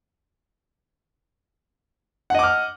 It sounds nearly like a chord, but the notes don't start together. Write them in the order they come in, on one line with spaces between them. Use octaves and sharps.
F#5 D#5 D6 F6